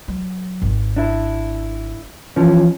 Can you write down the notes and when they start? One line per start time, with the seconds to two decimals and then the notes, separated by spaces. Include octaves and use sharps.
0.08 F#3
0.62 G#1 D#3
0.96 D4 E4
2.36 E3 F3 C#4